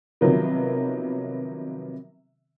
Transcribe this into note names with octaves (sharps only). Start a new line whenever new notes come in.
C3 D#3 F3 F#3 B3